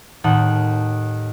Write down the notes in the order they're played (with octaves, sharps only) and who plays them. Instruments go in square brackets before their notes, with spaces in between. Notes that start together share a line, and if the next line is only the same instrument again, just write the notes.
[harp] D#2 A2 D#4 F#5 A5